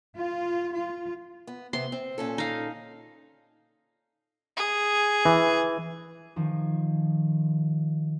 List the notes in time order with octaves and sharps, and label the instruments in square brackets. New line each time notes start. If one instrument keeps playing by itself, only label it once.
[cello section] F4
F4
[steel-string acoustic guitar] B3
[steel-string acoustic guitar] C3 B3 C4 [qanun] C6
[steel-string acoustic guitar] C4
A#2 C#4 A4
[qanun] D#4 F5
[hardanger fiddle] G#4
[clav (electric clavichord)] E3
[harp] D#3 F3